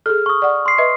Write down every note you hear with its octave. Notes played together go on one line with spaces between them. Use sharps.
G#4 A4 F6
C#6 D#6
D5 F#5
C6 C7
B4 D#5 E5